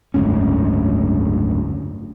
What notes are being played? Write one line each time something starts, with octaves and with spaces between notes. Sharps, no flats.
F#1 D2 G#2 C#4